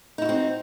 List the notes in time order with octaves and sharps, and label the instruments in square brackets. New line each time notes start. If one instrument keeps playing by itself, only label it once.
[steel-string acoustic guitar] D#4
E4
F#4
C4